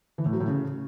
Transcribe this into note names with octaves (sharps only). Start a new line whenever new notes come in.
E3
A2
F#3
A2
C#3